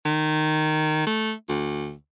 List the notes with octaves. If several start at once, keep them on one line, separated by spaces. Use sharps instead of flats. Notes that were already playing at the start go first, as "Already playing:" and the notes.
D#3
A3
D2